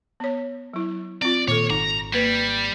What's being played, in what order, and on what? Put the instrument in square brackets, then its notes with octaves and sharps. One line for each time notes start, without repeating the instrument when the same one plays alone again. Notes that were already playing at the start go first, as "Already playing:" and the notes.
[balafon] B3 C#5
F#3 E4
[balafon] C4 F4 [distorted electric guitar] D5
[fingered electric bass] A#2 [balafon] D#3 A4 [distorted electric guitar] C#5
[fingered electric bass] G#1 [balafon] D#4 [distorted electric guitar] A#5
[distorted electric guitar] G3 [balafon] A#3 B4